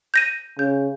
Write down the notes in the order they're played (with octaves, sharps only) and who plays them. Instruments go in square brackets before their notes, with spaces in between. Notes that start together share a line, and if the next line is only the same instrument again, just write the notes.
[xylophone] G6 A#6 D#7
[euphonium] C#3 [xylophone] G6